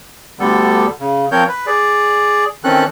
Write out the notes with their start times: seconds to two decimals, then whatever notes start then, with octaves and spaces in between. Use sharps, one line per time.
0.39 D2 D3 G3 B3 A4
1.00 C#3
1.32 F3 C4 A#4 C#5 G6
1.48 B4
1.66 G#4 D5
2.64 D#3 E3 C4 C#4 A4 F#6